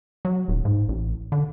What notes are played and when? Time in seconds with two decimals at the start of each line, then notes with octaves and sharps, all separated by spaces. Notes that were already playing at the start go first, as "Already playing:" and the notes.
0.25 F#3
0.48 D#1
0.65 G#2
0.89 A1
1.32 D3